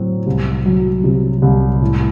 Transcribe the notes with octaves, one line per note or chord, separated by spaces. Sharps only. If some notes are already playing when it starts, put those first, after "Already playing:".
Already playing: A2 F#3 C4
C2
F#3
C3
C2
A2